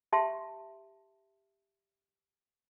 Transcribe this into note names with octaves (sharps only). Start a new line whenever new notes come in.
G4 E5 A5 C6